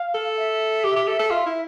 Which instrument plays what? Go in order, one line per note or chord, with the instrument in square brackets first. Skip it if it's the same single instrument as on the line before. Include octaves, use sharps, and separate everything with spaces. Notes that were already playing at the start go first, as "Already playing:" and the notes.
Already playing: [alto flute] F5
[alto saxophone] A4
[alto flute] E5
[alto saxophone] G4
G4
A4
A4
F4
E4